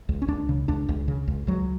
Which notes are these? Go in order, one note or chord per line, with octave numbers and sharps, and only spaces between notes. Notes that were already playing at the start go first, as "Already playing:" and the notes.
C#2
C#4
C#2 D4
C#3
C#2 D4
C#2
C#3
C#2
C#2 F#3